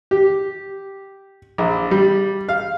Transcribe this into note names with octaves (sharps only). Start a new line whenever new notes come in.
G4
A#1
G3
F5